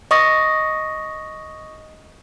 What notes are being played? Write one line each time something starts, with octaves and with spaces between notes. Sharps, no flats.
D#5 C#6 D#6 A#6